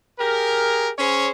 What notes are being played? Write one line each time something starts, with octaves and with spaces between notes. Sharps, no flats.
G4 G#4 A#4
C#4 G#4 C5 C#5